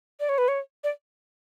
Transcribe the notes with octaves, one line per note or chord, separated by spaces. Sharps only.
D5
C#5
B4
C#5
D5